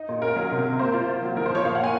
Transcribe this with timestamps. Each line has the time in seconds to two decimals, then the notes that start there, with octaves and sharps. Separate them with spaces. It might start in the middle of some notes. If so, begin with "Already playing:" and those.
Already playing: D#4
0.09 A#2
0.22 C#4 A#4
0.36 F#3
0.51 C3
0.65 C3
0.79 A#3 C5
0.93 F4
1.08 F4
1.22 F#3
1.36 F3 A#4
1.46 C5
1.50 F3 C#5
1.65 A#2 F5
1.75 F#5
1.79 A#3 G#5